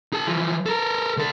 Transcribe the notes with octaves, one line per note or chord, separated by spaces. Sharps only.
G#4 A5
E3 F3
A4 A#4
D2 A4